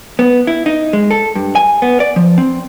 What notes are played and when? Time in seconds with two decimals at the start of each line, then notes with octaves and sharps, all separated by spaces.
0.19 B3
0.47 E4
0.66 D#4
0.93 G#3
1.11 A4
1.35 G2
1.55 G#5
1.82 B3
2.00 D5
2.16 F3
2.38 C4